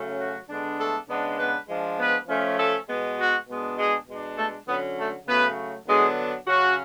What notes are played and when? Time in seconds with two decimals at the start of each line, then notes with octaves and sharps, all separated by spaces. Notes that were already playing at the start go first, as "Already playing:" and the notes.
Already playing: C#3 F#3 A3 C#4
0.19 F#4
0.49 D3 G#3 B3 D4
0.79 A3 A4
1.08 C#3 G#3 B3 D4
1.39 B3 B4
1.69 F3 G#3 D4
1.99 B3 B4
2.28 F3 A3 C#4
2.58 A3 A4
2.88 B2 G#3 B3
3.18 F#4
3.48 B2 G#3 B3 D4
3.77 G#3 G#4
4.08 B2 G#3 D4
4.37 A3 A4
4.67 D3 F#3 B3 C#4 B4
4.97 A3 A4
5.27 C#3 F#3 A3 B3 B4
5.87 D3 F#3 G#3 B3 D4 G#4
6.47 C#3 F#3 C#4 F#4